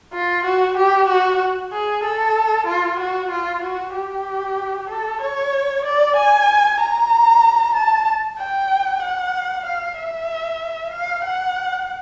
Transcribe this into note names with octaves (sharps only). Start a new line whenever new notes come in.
F4
F#4
G4
F#4
G#4
A4
F4
F#4
F4
F#4
G4
A4
C#5
D5
G#5
A#5
A5
G5
F#5
F5
E5
F5
F#5